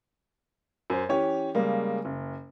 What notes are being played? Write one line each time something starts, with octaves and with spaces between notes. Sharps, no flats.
F#2 C5
E3 C#4 G4 C#5
C#3 G3 G#3 A#3
F#1